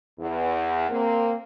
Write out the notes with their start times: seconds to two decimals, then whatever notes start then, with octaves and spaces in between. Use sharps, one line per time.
0.19 E2
0.89 A#3 C4